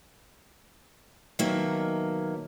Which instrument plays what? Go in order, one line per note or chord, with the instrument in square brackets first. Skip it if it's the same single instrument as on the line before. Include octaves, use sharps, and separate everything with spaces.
[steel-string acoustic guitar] B2 D#3 F#3 A#3 E5